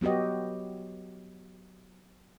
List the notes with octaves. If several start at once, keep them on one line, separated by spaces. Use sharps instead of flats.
F#3 B3 F#4 G4 D#5